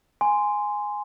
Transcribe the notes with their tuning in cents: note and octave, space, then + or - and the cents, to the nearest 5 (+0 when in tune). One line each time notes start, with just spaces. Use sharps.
G#5 +0 C6 -10